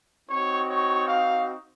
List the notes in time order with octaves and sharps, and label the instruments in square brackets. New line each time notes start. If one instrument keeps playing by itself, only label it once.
[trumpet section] C4 D#4 F#4 C#5
C#5
F5